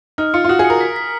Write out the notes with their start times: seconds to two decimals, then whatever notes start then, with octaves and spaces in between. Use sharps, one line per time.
0.18 D#4 F6
0.34 F4 C#7
0.45 F4
0.49 F#4 D#6
0.59 G#4
0.65 C#7
0.70 A#4
0.81 B6
0.96 B6